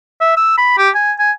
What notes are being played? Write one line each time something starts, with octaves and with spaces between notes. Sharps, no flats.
E5
E6
B5
G4
G#5
G#5